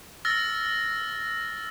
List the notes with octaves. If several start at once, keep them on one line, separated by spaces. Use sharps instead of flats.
E6 F6 A6 A#6